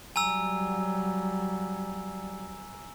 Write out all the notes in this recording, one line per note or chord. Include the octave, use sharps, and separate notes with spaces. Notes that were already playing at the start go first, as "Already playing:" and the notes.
F#3 G3 G#5 A#5 E6